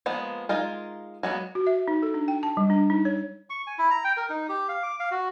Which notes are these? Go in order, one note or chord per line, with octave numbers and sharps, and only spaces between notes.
F3 G#3 A#3 B3
G#3 D#4 F4 A#4
F#3 G#3 A#3 B3
F#4
E5
D#4
A4
D4
G5
A5
G3
D4
D#4
C#5
C#6
G#5
E4
A#5
G5
A#4
D#4
G4
F5
D6
F5
F#4